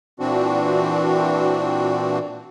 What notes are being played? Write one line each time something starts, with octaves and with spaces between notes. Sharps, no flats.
A#2 E3 C4 D4 F#4